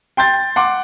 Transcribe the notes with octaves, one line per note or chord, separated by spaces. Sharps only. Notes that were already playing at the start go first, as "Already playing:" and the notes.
G5 C6 G6 A6
F#5 C6 D6